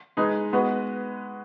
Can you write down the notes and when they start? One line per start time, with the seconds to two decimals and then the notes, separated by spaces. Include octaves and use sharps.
0.17 G#3 D#4 G#4 B4
0.53 G#3 B3 F#4 B4